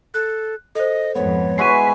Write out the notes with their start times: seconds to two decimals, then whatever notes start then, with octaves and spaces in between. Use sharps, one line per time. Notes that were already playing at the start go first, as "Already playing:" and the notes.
0.14 A4 F#6
0.75 A4 C5 D#5
1.15 F2 G#2 B3 C#5
1.58 G#3 E4 F#4 B4 E5 G#5 C7 D#7